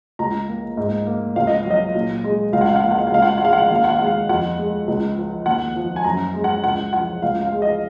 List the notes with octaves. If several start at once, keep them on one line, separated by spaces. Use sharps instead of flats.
C#2 A#5
A#3
G#2
A#3
C#2 F5
D#5
F#3
D#5
A#2
G#3
C#2 F5
F#5
F5
F#5
A#3 F5
F#5
F5
F#5
C#2 F5
F#5
F5
F#5
G#3 F5
F#5
F5
D#2 F#5
F5
F#5
F5
G#3 F#5
F5
F2 F#5
G#3
C#2
F3
D#2 F#5
F3
G#5
F#2 A#5
G#3
F#5
C#2 F#5
F3 F#5
C#2 F5
F5
G#3
D#5